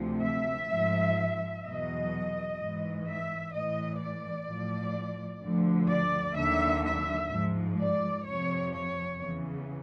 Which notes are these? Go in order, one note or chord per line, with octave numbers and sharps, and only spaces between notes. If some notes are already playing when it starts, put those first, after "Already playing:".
Already playing: D2 C3 F3
E5
G#2 F3
E2 B2 F#3 D#5
G#2 E3
E5
A2 E3 D#5
D5
A2 F3
D2 D3 F3
D5
D#2 D3 F#3 E5
E5
G#2 F3
D5
F2 C3 F3 C#5
C#5
E2 C#3 E3